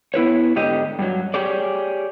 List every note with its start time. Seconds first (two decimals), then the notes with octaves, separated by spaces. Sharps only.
0.14 B3 E4 B4 C#5
0.56 G#2 D3 G4 D#5
0.99 G2 F#3
1.34 G4 G#4 C#5 D5